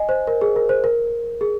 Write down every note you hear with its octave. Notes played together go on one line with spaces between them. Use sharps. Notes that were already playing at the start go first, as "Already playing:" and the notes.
Already playing: D#5 G#5
C5
A#4
G#4
A#4
C5
A#4
G#4